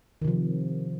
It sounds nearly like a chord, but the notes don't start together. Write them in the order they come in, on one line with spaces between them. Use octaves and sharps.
D#3 C3 F3